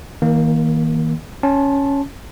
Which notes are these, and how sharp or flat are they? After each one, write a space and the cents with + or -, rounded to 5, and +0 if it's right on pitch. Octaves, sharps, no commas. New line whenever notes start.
D#3 +45 A#3 +10
C#4 +0 A5 -10 C6 +30